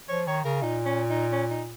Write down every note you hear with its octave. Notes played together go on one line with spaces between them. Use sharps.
F3 C#5
D#3 C#5
C#3 A#4
A#2 D#4
C#4
D#4
C#4
D#4